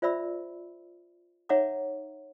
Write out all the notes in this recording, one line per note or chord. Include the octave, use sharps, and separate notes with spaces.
F4 C5 D5 E5 B5 E6
D#4 C#5 E5 F#5 A#5 D6